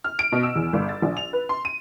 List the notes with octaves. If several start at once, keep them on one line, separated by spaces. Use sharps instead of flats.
F6
D7
B2
E6
E2
G1
A6
A#1
F7
B4
C6
D#7